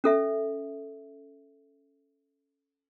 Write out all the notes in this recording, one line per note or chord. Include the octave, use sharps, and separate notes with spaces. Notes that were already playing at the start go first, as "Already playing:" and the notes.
C#4 A4 E5